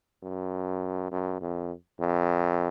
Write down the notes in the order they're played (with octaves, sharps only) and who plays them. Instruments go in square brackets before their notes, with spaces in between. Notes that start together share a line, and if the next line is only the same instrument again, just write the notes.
[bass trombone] F#2
F#2
F2
F2